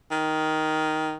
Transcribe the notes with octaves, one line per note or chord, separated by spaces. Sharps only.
D#3